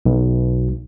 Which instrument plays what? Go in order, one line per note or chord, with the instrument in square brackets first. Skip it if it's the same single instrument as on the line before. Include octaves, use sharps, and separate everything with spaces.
[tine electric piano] B1